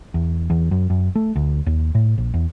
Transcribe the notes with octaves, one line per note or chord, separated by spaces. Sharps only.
E2
E2
F#2
F#2
A3
D2
D#2
A2
A#1
E2